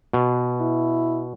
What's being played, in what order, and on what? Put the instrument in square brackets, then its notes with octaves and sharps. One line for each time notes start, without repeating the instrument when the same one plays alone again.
[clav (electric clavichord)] B2
[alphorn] E4